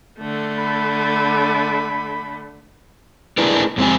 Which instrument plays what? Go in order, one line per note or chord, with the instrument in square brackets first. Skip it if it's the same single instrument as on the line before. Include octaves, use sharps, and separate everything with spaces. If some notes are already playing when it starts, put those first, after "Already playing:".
[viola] D3 A3
[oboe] B5
[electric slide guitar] A3 D4 E4 G#4 A#4 B4
F2 G#3 C4 F#4 G4 G#5